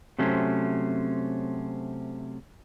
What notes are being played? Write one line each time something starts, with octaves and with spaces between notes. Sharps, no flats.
C3 F#3 A3 C4 C#4